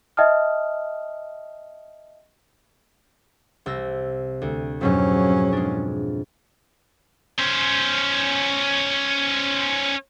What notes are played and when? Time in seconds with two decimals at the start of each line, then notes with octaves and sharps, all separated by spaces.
0.17 D#5 E5 G5 A5 D#6 F6
3.66 C2 E6 A#6
4.42 D2
4.81 F2 G#2 B2 F#3 C#4
5.53 G#3 D4
7.39 C#4 C5